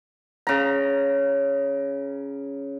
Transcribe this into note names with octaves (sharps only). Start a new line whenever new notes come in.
C#3 A#5